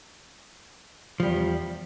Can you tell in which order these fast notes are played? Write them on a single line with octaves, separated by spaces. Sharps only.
F3 G3 E2